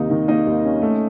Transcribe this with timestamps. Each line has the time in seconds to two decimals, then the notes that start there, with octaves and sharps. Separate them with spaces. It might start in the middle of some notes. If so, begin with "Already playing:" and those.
Already playing: D#2 C3 A#3 D#4 D#5
0.10 D#3
0.28 A#3 D#4 D#5
0.47 D#2
0.65 C#4
0.82 A3